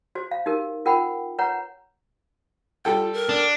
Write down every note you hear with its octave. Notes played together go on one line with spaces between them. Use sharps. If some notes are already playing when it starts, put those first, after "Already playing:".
F#4 C5
F5
D#4 G4 A#4
F4 A#4 C5 F#5 G5 B5
B4 C#5 F#5 A#5
G3 F4 A4 G5
A#4
D4